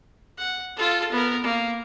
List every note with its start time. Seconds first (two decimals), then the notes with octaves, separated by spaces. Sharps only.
0.38 F#5
0.77 F4 A4
1.12 B3 A#4
1.43 A#3